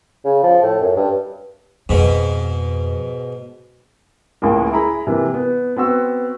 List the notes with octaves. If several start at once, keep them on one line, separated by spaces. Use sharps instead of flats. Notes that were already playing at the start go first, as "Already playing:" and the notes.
C#3
F3
A2
F#2
G2
F2 G#2 B2
C#2 A2 G#3 A#3
E4 G#4 A#5 B5
C3 E3 A#3
B3
B3 C4 F#4 E6